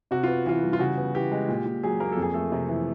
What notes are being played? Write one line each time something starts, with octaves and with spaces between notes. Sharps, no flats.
C3 F#4
B3 F4
E3 F4
G3
F4
C#3 F#4
B3
E3 G4
G#3
A#2
A#2
F#3 G#4
A#3 A#4
F2 A4
G#4
A3 A4
C3
E3